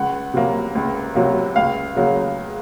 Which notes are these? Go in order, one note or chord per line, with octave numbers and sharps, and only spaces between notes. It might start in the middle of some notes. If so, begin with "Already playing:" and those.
Already playing: C#2 F#5
C3 F#3 A#3
C#2
C3 F#3 A#3
C#2 F5
C#3 F#3 A#3